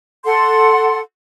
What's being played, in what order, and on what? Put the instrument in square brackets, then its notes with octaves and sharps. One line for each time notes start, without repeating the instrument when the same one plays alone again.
[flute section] A4 F#5 C6